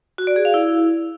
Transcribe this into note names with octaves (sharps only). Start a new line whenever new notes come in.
F#4
D5
G#4
F5
E4